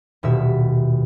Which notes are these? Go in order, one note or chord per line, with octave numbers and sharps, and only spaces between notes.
D#1 B2 E5